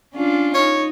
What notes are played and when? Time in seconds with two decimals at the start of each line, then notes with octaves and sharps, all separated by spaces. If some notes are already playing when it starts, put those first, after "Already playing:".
0.14 C#4 D4 F4
0.54 D#4 C#5